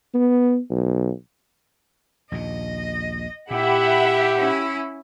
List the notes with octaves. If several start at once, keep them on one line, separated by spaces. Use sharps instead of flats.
B3
B1
A#1 D#2 A#2 D#5
A#2 E4 G4 E5 F#5 B5
C#4 E4